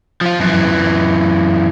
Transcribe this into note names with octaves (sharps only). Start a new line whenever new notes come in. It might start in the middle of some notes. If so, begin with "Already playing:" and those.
F3 F4
F#2 E3